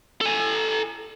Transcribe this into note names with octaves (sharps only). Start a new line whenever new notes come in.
A4 G#5